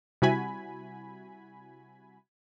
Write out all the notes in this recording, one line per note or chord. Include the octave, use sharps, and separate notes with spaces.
C3 G3 E4 F#4 G#5 B5